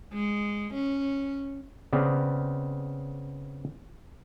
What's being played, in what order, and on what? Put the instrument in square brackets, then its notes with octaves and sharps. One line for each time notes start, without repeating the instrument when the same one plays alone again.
[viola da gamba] G#3
C#4
[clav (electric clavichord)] C#3 B3 C4 D5